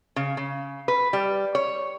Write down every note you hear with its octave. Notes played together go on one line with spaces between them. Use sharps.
C#3
C#3
B4
G3
C#5